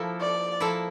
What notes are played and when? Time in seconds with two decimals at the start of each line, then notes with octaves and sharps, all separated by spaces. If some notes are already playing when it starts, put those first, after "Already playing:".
Already playing: F3 A#3 E4 A4
0.21 D5
0.60 F3 A#3 E4 A4